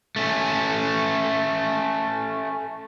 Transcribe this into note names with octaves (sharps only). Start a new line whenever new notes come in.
A3 C#4